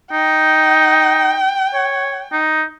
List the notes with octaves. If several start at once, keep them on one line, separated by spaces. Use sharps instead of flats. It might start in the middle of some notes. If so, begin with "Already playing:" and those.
D#4 G5
C#5
D#4